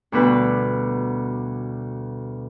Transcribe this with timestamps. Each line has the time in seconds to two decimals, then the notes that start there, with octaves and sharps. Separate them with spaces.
0.12 D2 B2 G3 B4